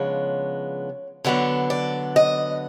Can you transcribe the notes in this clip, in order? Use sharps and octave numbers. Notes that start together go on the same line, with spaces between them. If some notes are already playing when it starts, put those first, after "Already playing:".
Already playing: C#3 F3 G#3 B3 D4 C#5
D3 F#3 B3 D4 D5
D5
D#5